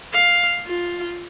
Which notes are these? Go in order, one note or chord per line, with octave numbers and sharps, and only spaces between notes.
F5
F4